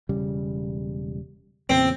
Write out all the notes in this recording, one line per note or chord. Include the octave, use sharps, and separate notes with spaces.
E1 C#3 G3
E2 A#2 C#3 C4